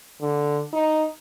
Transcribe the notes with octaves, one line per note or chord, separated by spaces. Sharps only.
D3
D#4